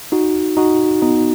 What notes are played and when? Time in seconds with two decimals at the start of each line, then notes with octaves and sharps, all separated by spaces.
0.12 D#4 F#4
0.57 D#4 F#4
1.02 B3 D#4